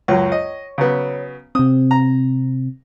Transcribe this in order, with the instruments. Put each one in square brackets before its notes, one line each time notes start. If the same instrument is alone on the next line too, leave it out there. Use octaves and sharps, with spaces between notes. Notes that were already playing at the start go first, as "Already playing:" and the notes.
[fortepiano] C#2 F#2 [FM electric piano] C#5
[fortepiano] D#5
C#3 F#3 B3
[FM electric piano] C3 C4 [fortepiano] D#6
[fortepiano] A#5